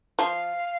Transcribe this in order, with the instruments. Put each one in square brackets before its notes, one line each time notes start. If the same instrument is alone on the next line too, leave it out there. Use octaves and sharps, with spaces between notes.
[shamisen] F3 [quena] F5